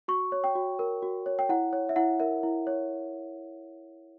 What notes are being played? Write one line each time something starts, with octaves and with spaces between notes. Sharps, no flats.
F#4 C#6
C#5
G5
F#4
A#4
F#4
C#5
G5
E4 F#5
C#5
E5
E4 F#5
A#4 E5
E4
C#5